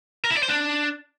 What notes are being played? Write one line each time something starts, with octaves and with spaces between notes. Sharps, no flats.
A#4
E4
D5
C5
D4